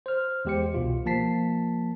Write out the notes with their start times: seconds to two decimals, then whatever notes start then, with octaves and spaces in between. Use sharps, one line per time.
0.06 C5 F6
0.45 E2 G#3 G4 C5 C#7
0.74 C2 B2 F4
1.06 F3 A#3 A5 B6 C7